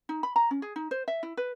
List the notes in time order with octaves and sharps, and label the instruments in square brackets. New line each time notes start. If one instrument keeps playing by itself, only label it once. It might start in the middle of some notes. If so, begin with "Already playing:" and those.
[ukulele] D#4
B5
A#5
C#4
G#4
D#4
C5
E5
E4
B4